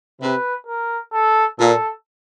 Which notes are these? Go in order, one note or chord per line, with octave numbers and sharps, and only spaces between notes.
C3 B4
A#4
A4
A#2 A4